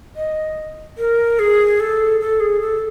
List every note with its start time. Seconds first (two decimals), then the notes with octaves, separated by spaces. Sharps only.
0.16 D#5
0.98 A#4
1.39 G#4
1.80 A4
2.20 A4
2.40 G#4
2.61 A4